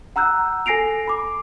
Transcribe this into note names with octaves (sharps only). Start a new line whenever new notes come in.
F#5 A#5 E6 F#6 G6
A4 G#5 A#6 C7 D7 F7
B5 D6